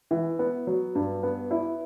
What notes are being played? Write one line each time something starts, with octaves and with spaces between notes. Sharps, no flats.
E3
B3
F#3
G2
B3
E4